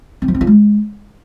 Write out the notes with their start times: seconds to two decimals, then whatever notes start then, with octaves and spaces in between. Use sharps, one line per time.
0.22 C4
0.28 F3
0.34 C4
0.41 F4
0.47 G#3